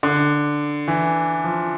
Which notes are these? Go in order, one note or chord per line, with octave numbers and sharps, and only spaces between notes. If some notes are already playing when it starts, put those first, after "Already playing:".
D3
E3
F3